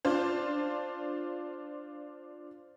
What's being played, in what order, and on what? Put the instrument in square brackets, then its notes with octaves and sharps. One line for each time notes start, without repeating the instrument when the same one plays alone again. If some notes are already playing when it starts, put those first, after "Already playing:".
[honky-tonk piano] D4 F4 C5